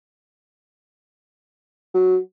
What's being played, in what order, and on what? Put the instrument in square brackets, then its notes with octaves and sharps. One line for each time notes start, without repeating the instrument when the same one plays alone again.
[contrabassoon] F#3